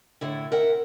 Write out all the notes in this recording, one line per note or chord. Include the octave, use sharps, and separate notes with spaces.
A2 D3 E4
A#4 E5 F#5 G5